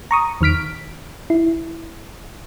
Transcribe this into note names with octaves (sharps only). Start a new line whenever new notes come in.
A#5 C#6 D#6
E2 D#3 F6 B6 D7
E4